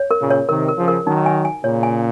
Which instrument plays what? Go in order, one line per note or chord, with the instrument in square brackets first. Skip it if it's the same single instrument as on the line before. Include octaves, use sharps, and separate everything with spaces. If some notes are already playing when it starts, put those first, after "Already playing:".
Already playing: [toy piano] C#5
A#4
[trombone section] A#2 C#3
[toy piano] C#5
[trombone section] C3 D#3 [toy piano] A#4
[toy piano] A#4
[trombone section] C#3 F3
[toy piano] A#4
[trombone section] D#3 F#3 [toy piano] D#4
[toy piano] G#5
G#5
[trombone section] A#2 C#3 [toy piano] C#5
[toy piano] G#5